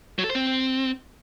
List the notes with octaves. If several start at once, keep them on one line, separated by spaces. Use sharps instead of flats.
F#3
A4
C5
C4